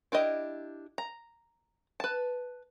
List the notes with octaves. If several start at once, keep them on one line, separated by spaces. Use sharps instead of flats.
D4 E4 G4 D#5
A#5
B4 A5